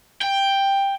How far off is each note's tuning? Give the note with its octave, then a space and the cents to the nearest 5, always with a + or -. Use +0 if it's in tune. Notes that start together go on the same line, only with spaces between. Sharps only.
G5 +10